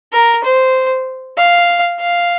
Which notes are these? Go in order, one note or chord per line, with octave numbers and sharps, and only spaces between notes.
A#4
C5
F5
F5